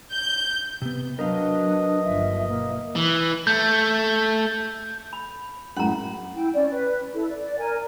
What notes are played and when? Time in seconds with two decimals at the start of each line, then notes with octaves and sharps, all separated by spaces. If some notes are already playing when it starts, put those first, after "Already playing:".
0.12 G6
0.82 C3 B3
1.19 F#3 D4 A#4 B4 D#5 F5
2.04 G1 D#2 F3 E5
2.48 B2 A#3
2.96 E3
3.47 A3 G6
5.13 B5
5.77 F#2 A2 G#3 C#4 F#5 A#5 B5
6.35 E4 G5
6.54 C#4 D5
6.70 B4
7.13 E4 A4
7.28 D5
7.58 A#4 G#5